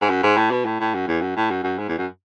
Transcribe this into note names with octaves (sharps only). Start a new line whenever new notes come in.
G#2
F#2
G#2
A2
B2
A2
A2
F#2
E2
F#2
A2
F#2
F#2
G#2
E2
F#2